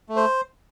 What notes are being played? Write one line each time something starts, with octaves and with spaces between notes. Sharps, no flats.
A3
C5